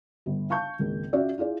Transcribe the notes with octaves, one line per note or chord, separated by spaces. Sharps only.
G1
F5 A5 C#6 G6
G#1 C#2 A#3
C#4 F4 F#4 D5 E5
E4 F4 G#4 D5